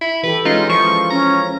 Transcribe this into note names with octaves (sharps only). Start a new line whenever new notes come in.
E4
E3 G4 A4 B4
G#3 C#4 D#4 F4
F3 E4 C#6
C#4 A#5